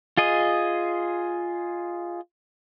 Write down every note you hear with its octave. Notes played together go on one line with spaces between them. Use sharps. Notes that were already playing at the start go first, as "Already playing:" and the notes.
F4 G#4 D#5